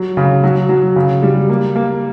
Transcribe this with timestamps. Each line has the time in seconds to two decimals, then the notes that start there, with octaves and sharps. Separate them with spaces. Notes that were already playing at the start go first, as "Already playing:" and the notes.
Already playing: F#3
0.17 C#3
0.43 F#3
0.69 F#3
0.96 C#3
1.23 G3
1.49 A#3
1.76 A#3